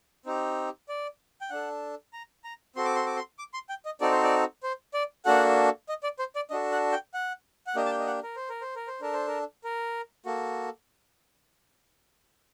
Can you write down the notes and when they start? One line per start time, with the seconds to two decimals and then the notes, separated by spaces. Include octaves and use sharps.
0.26 C4 D#4 G4
0.88 D5
1.41 G5
1.50 D4 A4 F#5
2.13 A#5
2.44 A#5
2.76 C4 F#4 A4 C6
2.85 D6
2.96 C6
3.06 D6
3.16 C6
3.39 D6
3.54 C6
3.69 G5
3.85 D#5
4.00 C4 D#4 F#4 A4 D5
4.11 C5
4.23 D5
4.63 C5
4.94 D5
5.25 A#3 D4 F#4 A4 F#5
5.89 D#5
6.03 D5
6.19 C5
6.36 D5
6.50 D4 F#4 A4 D#5
6.72 F#5
6.92 G5
7.14 F#5
7.67 F#5
7.75 A#3 D4 G4 D#5
7.86 A5
7.91 G5
8.00 D#5
8.07 F#5
8.23 A#4
8.36 C5
8.49 A#4
8.61 C5
8.75 A#4
8.87 C5
9.01 D4 A4 A#4
9.13 C5
9.28 A#4
9.64 A#4
10.26 A#3 F#4 A4